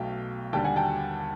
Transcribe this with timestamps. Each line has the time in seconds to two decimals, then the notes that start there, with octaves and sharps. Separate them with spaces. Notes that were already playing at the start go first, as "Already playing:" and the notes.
Already playing: B1 B2 F#3 A3 F5 G5
0.53 D#2 D3 G3 G5 A5
0.64 F#5 G#5
0.76 G5 A5